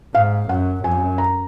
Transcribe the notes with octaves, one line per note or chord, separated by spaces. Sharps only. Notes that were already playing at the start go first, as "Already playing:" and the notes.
G#2 F5
F#2 F#5
F#2 G#5
A#5